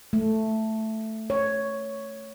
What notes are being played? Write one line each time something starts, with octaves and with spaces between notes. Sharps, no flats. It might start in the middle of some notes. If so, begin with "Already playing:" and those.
A3
C#5